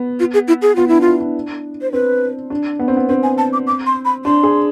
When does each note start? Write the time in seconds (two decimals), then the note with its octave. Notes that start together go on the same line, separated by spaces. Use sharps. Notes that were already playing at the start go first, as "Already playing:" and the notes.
Already playing: B3
0.20 F4
0.34 G#4
0.48 E4
0.62 G#4
0.76 B3 F4
0.88 D4 E4
1.01 E4 F4
1.20 D4
1.82 C5
1.92 C4 B4
2.50 D4
2.79 B3
2.88 C4
2.97 B3
3.09 C4 B4
3.23 G#5
3.38 A5
3.53 D6
3.67 D6
3.86 C6
4.05 B5
4.25 D4 C6
4.43 G#4